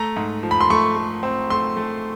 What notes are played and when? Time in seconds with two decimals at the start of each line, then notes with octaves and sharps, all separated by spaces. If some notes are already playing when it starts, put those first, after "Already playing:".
Already playing: A3 A#5
0.17 G#2
0.43 F3
0.51 B5
0.61 C6
0.70 A3 C#6
0.96 A3
1.23 C4
1.50 A3 C6
1.77 A3